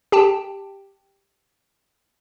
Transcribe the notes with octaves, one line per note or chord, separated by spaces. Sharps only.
G4 G5 A5